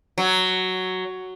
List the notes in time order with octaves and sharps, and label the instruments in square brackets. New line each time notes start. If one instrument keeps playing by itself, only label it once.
[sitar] F#3